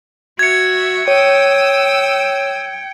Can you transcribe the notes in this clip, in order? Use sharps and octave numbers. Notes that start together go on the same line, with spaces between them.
F#4 E5 G#6 C#7
C#5 G5 D#6 E6